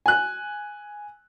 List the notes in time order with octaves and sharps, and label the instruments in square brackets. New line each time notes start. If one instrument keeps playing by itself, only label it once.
[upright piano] G#5 F#6